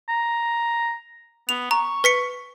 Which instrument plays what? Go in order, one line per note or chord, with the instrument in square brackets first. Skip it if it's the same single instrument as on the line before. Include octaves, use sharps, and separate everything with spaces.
[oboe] A#5
[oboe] B3 [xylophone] F7
[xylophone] A#5 [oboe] C#6
[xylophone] B4 B6 C#7